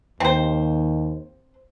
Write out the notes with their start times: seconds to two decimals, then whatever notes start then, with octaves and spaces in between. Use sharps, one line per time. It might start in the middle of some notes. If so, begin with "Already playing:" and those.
0.20 D#2 C4 C5